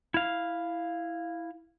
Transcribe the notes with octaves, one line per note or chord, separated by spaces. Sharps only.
E4 F5